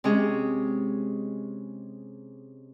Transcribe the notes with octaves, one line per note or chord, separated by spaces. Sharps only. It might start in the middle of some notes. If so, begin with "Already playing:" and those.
C3 G#3 C#4 G#4